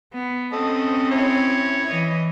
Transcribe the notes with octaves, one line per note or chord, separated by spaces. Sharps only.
B3
A3 C4 C#4 D#5 A5
E4 C#5
E3 D#5